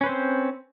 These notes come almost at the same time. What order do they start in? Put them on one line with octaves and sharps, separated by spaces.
C#4 B4 C5 C4